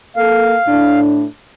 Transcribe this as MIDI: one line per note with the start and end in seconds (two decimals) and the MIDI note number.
0.17 0.55 58
0.17 0.55 69
0.17 1.00 77
0.67 1.24 45
0.67 1.24 62